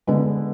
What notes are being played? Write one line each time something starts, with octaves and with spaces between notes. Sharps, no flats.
D3 G#3 B3